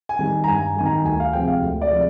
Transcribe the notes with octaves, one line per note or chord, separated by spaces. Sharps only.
G#5
D#3 G3
A#5
G2 G#5
D#3 G3 G#5
A#5
D2 G#5
F5
C3 F3 G#3 G5
F5
D2
D5
C3 F3 G#3